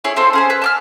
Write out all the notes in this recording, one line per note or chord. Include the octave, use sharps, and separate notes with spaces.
E4 G#4 C#5
C4 F4 A4 C5
C#4 G#4 C5
B4
A5 D6 F6